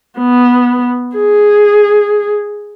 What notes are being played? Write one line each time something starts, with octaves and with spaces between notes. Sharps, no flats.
B3
G#4